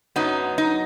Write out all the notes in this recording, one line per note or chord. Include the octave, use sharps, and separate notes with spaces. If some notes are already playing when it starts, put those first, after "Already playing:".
F#2 F#3 B3 D#4
D#4